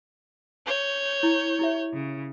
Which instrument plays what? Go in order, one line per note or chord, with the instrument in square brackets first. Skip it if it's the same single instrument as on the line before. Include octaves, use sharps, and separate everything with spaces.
[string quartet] C#5 G6
[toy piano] E4
E4 G4 E5
[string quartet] C#3